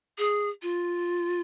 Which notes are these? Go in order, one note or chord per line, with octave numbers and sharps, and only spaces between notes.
G#4
F4